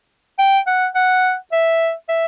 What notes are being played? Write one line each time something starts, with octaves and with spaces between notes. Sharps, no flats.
G5
F#5
F#5
E5
E5